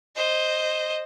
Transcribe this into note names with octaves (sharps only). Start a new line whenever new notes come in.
C5 D#5